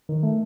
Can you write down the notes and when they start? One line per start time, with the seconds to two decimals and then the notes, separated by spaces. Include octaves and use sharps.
0.09 D#3
0.23 A3